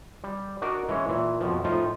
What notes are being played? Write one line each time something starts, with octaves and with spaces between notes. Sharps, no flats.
G3
D4 F#4 A#4 D5 D#5
E3 G#3 C#4 C#5
A#2 E3
F2 B2 F3
A2 F3 D#4 F4